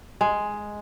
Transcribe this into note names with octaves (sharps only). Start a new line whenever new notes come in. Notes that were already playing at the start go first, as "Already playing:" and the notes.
G#3